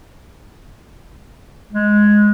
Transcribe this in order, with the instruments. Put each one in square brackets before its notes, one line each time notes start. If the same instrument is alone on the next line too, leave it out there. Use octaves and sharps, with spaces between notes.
[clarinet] G#3